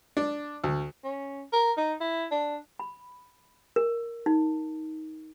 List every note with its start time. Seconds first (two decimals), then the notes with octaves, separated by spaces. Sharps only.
0.17 D4
0.64 D2
1.04 C#4
1.52 A#4
1.77 D#4
2.01 E4
2.31 D4
2.79 B5
3.76 A#4
4.26 D#4